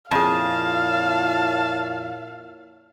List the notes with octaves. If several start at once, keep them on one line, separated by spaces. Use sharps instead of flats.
F2 A#2 E4 G#4 C#5 F5 A5